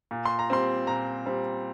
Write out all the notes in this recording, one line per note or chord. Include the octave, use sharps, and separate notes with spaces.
A#2
C6
A#5
G3 C4 C6
A#2 A#5
G3 C4